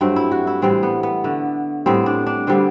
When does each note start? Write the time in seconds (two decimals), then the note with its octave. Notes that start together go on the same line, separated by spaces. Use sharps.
0.01 G2 F#3 A3 C4
0.16 E4
0.32 F#4
0.47 E4
0.62 A2 E3 G3 C4
0.83 B3
1.03 B3
1.24 D3 A3
1.86 A2 G3 B3 C4
2.06 D4
2.27 D4
2.47 D3 G3 B3 C4